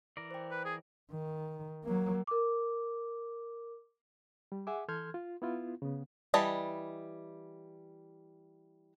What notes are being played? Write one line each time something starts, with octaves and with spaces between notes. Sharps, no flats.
E3 A#4 D5
C5 G5
B4
G#4
D#3
F#3 A#3
A#4 D6
G3
G#4 E5 F#5 G#5 D6
E3 A4 C6 F6 G6 G#6
F4
B3 E4 F4
C#3 B3
E3 G3 D#5 A5